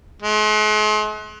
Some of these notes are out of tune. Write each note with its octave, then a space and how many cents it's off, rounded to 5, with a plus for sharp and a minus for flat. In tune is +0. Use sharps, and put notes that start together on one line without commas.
G#3 +45